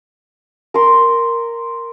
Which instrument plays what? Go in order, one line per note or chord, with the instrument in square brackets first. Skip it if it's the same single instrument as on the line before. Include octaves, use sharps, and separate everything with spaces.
[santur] A#4 C6